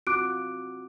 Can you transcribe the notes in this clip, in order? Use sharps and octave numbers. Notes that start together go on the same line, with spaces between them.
C4 F4 F#4 D6 F#6 D7